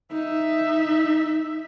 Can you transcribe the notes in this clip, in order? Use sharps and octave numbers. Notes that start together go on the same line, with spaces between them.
D#4 E5